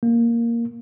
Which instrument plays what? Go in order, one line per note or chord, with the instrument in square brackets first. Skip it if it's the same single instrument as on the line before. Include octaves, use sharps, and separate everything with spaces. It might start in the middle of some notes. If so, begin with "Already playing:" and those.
[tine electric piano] A#3